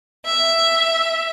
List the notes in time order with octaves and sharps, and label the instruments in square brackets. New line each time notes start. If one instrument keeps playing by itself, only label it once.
[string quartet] E5